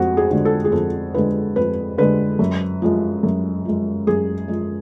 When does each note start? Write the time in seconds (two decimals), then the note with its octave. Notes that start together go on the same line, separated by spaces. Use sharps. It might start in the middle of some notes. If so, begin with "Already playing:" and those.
Already playing: F2 G#3 F#4
0.17 G#4
0.30 D3 G#3
0.45 A4
0.64 G#4
0.72 F2 A4
1.14 D3 G#3 B4
1.56 F2 B4
1.98 D3 G#3 B4
2.39 F#2
2.82 F3 G#3
3.23 F#2
3.65 F3 G#3
4.07 F#2 G#4
4.48 F3 G#3